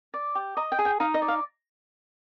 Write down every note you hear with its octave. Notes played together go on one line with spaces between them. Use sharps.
D5
G4
D#5 A#5
G5
G#4
G5
D#4 F5
D#5
D5
F5